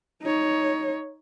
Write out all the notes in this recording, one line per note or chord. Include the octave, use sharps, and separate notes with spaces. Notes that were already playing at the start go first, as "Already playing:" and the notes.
D#4 C#5